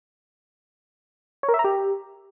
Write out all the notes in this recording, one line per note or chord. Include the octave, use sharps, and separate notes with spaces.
C#5
A#4
E5
A#5
G4